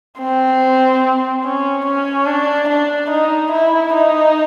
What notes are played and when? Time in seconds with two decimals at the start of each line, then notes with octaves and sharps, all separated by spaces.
0.19 C4
1.44 C#4
1.86 C#4
2.27 D4
2.69 D4
3.11 D#4
3.52 E4
3.94 D#4